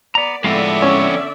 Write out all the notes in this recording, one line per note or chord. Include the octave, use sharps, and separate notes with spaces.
B3 D5 A#5
F2 A2 D3 G#3 B3 D5 E5 F5
C#4